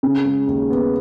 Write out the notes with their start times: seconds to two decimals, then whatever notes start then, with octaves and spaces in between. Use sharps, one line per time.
0.03 C#3
0.25 G#3
0.47 D#2
0.70 B3